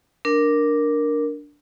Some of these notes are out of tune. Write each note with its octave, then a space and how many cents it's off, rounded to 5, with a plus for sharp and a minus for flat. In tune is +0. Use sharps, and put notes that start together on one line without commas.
D4 +0 A#4 +0